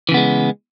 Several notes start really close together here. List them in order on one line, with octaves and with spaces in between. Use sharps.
E3 C#3 B3 G#3